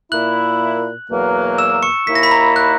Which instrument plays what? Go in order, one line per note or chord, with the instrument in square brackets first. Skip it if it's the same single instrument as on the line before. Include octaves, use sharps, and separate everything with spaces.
[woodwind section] A#2 A#3 E4 [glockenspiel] F#6 F#7
[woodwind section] E2 B2 F#3 A#3
[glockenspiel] E6 E7
C#6 C#7
[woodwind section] D#2 D#3 A#3 E4 [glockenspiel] B6
[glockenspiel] A#6
B5 B6
A#5 A#6
F#6